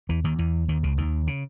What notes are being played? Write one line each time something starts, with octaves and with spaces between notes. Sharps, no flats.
E2 E3
D#2 D#3
E2 E3
D#2 D#3
C#2 C#3
D#2 D#3
C#3